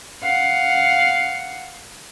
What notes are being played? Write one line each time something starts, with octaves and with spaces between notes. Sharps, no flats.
F5 F#5